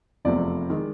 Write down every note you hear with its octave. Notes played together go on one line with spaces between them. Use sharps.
F1 E2 C3 F3 A3 D5
D#3 G#3